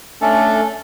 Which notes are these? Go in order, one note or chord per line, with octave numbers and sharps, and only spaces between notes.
A3 C#4 D4 A4